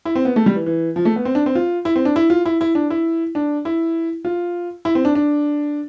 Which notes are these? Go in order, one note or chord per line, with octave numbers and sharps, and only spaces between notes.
E4
C4
B3
A3
G3
E3
E3
F3
A3
B3
C4
D4
C4
F4
E4
C4
D4
E4
F4
E4
E4
D4
E4
D4
E4
F4
E4
C4
D4
D4